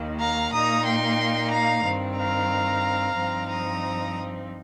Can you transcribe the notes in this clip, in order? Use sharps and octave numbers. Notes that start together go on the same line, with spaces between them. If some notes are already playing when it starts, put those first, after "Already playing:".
Already playing: D#2 D#3 A#3
F5 A#5
A#2 A#3 D#4 A#5 D#6
G5 C6
F5 A#5
G2 D#3 C4
F5 A#5
G2 F3 C4 D#4
A#5 D#6